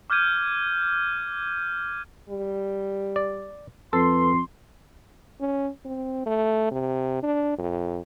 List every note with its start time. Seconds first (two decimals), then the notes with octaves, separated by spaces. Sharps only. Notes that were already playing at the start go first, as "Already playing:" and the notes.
0.10 D6 F6 G6 G#6 D#7
2.30 G3
3.16 D5
3.93 F2 A4 B4 C6
5.40 C#4
5.85 C4
6.26 A3
6.71 C3
7.23 D4
7.59 F2